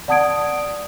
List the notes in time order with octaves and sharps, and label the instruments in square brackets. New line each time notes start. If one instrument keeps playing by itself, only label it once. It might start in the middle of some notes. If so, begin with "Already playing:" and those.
[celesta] D5 F#5 A5 D#6 G#6 D7